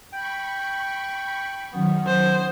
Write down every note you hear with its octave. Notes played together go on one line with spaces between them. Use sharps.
G5 B5 C#6
F#2 D#3 B3
C5